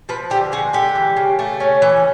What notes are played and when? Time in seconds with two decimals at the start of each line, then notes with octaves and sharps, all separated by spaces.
0.09 F3 B4
0.30 D3 G4
0.52 G#3 F#4
0.73 D3 G4
0.95 E3
1.17 C#3
1.39 A3
1.60 C#4
1.82 E3